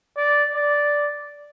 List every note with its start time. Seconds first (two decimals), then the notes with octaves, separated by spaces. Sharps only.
0.17 D5
0.55 D5